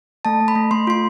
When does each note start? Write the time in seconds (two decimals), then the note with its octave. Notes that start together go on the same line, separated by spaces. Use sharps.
0.25 A3 A5
0.40 A3
0.48 B5
0.55 A3
0.71 A3 C6
0.87 F4 C6